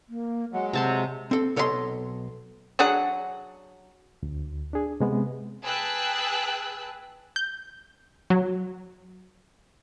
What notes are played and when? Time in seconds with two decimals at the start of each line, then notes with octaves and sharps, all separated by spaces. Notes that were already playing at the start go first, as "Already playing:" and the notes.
0.09 A#3
0.53 F#3 G#3 F#5
0.73 C3 F#5 A5 C6
1.31 C4 A4
1.56 B1 A4 C#5 D#5 G5 C6
2.79 F#3 D4 G#4 F#5
4.23 D2
4.73 D4 G#4
5.00 C3 G#3 B3
5.63 G#4 B4 G5 A5 E6 F#6
7.36 G6
8.30 F#3